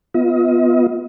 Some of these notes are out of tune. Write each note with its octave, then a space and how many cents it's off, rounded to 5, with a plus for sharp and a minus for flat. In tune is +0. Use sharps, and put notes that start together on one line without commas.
B3 +0 F4 +0 D#5 +40